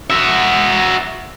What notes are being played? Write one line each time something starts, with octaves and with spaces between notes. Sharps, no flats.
F#4 E5